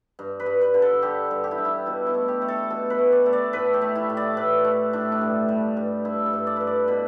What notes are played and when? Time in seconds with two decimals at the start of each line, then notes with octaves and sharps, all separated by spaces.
0.19 G2
0.40 B4
0.46 G2
0.61 B4
0.74 D3
0.82 A4
1.02 D3 G4
1.31 G2
1.44 G4
1.51 E4
1.58 G2 D4
1.65 E4
1.86 B2 E4
2.07 E4
2.14 A3
2.28 G4
2.42 A3
2.48 A4
2.70 B2 A4
2.90 B4
2.98 A3
3.12 D5
3.26 A3
3.33 D5
3.53 A2 B4
3.74 G4
3.82 A3
3.95 E4
4.10 A2
4.17 D5
4.37 A2 B4
4.65 A3
4.93 A2 D4
5.12 D4
5.21 G2
5.48 G3
5.77 G2
6.05 G2 E4
6.26 A4
6.33 G2
6.47 D5
6.56 G2 B4
6.67 D5
6.88 B2 B4